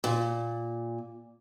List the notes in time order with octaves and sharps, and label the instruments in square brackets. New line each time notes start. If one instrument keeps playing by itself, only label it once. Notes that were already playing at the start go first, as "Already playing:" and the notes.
[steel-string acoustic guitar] A#2